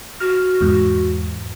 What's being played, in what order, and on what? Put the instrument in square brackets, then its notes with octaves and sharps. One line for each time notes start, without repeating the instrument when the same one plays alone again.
[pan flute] F#4 [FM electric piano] F6
[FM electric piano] E2 G#2